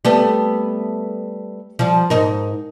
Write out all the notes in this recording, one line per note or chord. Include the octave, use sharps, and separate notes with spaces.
G3 A3 B3
F3 G3
G#2 D#4 A#4